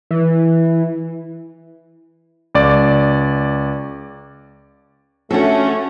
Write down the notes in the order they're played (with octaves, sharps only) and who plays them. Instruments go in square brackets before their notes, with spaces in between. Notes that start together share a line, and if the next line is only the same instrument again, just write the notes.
[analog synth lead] E3
[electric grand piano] C#2 D5
[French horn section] A3 [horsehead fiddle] C#4 [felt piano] D4 A4 [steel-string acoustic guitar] F#4 F#5